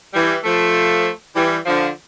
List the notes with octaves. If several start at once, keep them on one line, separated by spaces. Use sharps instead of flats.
E3 G3
F3 A3
E3 G3
D3 F3